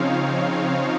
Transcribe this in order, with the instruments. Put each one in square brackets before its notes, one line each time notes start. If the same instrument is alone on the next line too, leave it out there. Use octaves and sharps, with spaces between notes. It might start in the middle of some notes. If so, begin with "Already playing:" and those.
Already playing: [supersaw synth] C#3 F3 C4 D#4 C#5 F5